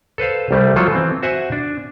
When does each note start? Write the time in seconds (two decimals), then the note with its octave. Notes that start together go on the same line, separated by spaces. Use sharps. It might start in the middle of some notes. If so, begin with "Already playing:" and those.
0.18 A4 B4 C5 F5
0.51 C2 G3 A3
0.76 F3 F#3 F4 A4
0.91 E3 C4
1.23 F#4 C5 E5 F#5 G#5
1.52 D4